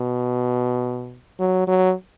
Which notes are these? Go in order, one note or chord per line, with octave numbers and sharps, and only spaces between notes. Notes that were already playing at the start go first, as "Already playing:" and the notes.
Already playing: B2
F#3
F#3